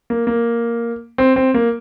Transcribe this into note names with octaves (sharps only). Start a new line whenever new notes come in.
A#3
A#3
C4
C4
A#3